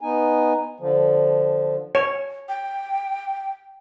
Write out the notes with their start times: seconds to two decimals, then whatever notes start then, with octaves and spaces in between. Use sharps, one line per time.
0.01 B3 D#4 G#5
0.80 D3 F3
1.95 C#5
2.49 G5